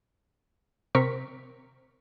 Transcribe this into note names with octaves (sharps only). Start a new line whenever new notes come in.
C3 C4 A#4 C#6 B6